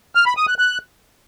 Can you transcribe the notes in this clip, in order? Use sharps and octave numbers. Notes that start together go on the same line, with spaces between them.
F6
B5
D#6
F#6
F#6